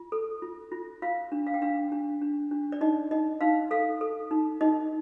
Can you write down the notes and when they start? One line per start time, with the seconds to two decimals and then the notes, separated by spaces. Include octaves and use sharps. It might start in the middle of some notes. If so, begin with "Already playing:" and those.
Already playing: F4
0.12 A4
0.42 F4
0.72 F4
1.02 F4 F5
1.32 D4
1.47 F5
1.54 G5
1.62 D4 F5
1.92 D4
2.21 D4
2.51 D4
2.72 D5
2.81 D#4 D#5
3.11 D#4 D#5
3.41 D#4 F5
3.71 A4 F5
4.01 A4
4.31 D#4
4.61 D#4 D#5